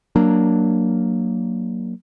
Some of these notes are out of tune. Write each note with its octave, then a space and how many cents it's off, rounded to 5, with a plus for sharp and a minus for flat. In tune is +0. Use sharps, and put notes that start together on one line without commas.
F#3 +0 A#3 +0 D4 +10